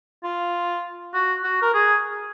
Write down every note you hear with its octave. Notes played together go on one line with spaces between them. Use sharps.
F4
F#4
F#4
A#4
G#4